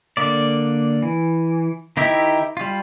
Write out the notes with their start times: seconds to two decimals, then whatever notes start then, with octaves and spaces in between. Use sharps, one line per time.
0.17 D3 A#3 D5
1.02 E3
1.97 D#3 D#4 E4 G4 E5
2.57 G3 F4